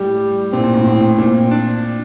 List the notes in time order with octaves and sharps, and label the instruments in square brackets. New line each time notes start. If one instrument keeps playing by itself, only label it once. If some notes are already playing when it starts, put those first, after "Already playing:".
Already playing: [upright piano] A2 [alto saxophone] G3
[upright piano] A#2 [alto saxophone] C4
[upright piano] A#2
A2
A2
[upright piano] A#2 [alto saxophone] C4
[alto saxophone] D4